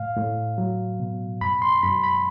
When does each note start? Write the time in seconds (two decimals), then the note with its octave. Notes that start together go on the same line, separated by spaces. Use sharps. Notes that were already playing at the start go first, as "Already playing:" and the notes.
Already playing: A2 F5
0.16 A2
0.58 F#3
1.00 B2
1.41 F#2 B5
1.62 C6
1.83 F#2 B5
2.04 B5